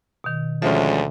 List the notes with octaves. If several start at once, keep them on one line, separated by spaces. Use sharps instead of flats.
B2 D#3
D2 F3 G#3 C#4 E5